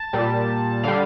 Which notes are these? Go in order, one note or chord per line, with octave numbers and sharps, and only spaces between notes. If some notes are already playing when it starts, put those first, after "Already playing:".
Already playing: A5
A#2 G3
D3 G3 F5